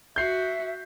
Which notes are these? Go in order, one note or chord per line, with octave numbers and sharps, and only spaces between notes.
F#4 E5 G6 C7